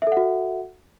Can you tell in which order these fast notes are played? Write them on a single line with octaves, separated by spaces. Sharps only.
E5 A4 F#5 F#4